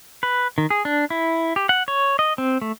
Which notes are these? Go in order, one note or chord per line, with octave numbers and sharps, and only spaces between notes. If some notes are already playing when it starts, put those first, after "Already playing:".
B4
D#3
G#4
D4
E4
G4
F#5
C#5
D#5
C4
A3